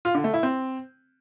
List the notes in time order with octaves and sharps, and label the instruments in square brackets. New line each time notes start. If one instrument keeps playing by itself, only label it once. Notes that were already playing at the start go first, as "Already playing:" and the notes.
[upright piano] F4
D3
A3
E4
C4